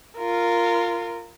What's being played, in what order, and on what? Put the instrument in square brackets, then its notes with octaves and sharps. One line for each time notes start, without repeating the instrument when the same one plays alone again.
[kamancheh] F4 A#4